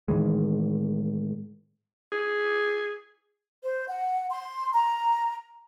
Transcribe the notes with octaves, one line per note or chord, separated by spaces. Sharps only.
A2 D#3 E3 G#3
G#4
C5
F#5
C6
A#5